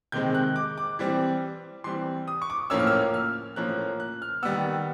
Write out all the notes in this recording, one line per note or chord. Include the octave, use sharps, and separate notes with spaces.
C3 D#3 G#3 C4 G6
F#6
D6
D6
E3 G3 C4
E3 G3 C4 C6
D#6
C#6
D6
A2 F3 A#3 C#4 E6
F6
E6
F6
A2 F3 A#3 C#4 F#6
F#6
F6
D#3 G3 B3 E6